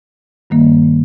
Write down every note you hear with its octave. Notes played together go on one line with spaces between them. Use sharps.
G2 D#3 G3 A#3